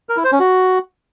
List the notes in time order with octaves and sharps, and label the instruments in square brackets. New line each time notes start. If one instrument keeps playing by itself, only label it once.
[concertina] A#4
E4
C5
C#4
F#4